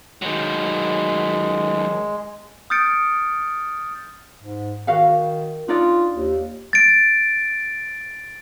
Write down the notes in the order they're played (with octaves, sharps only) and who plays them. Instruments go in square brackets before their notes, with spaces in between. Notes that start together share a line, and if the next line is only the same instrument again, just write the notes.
[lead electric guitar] D#3 F#3 [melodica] G#3
[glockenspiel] D#6 F6 G6 A6 C#7 D7
[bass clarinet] G#2
[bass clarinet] D#3 [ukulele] F#4 F5 F#5
[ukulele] D4 D#4 D5 [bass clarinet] F4
[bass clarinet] D#2
[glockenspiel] A6 D7